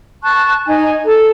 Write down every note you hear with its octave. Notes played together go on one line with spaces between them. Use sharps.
A5 C#6 F#6
D#4 G#5
A4